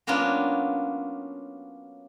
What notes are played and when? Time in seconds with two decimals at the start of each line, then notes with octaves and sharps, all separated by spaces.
0.07 F#3 A#3 B3 C#4 D4 F4